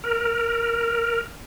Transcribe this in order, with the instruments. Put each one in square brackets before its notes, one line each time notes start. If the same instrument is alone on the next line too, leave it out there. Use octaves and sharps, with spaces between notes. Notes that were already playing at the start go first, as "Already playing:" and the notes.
[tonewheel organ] A#4